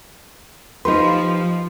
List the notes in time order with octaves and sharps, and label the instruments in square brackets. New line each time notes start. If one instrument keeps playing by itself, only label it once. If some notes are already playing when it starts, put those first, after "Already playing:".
[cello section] F3 [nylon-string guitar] D#4 G4 B4 [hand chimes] C6